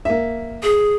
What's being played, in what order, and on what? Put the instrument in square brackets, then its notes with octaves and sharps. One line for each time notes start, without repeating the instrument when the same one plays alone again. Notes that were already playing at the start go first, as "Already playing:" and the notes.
[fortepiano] A#3 E5
[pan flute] G#4